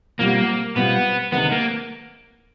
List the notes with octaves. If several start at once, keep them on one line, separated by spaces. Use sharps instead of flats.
B2 G3 A#3 C4 F4
B2 G3 B3 C4 F4
D2 C3 D#3 G#3 B3 C4
A#3